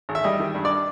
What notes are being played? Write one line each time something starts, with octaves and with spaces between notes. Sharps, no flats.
G#1
E5
G3 D#5
D#3
G2
D5